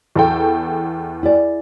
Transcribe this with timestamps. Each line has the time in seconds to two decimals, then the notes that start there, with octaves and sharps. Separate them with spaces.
0.16 E2 A4 G5
1.23 E4 G#4 D5